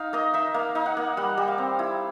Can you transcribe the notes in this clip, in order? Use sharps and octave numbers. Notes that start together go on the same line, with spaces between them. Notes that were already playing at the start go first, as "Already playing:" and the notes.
Already playing: D#4 F5
A#3 D#5
D#4 E5
A#3 F5
D#4
F#5
A#3
G3 F#5
G3
F5
C4
E4